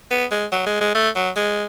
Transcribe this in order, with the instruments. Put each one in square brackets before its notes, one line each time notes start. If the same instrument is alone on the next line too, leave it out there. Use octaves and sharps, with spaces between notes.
[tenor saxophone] B3
G#3
F#3
G#3
G#3
A3
F#3
G#3